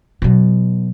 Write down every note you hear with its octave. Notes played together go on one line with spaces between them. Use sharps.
B2 F#3